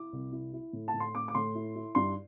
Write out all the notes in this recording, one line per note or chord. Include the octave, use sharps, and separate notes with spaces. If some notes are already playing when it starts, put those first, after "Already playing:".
Already playing: E4 D6
C2
E4
E4
A2
A5
A2
C6
A3 D6
D6
A2 C6
E4
E4
G2 C6